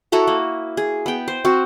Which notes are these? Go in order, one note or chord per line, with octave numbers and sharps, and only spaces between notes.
E4 F#4 A4 A#5
A#3
G#4
B3 G5
C5
C4 F#4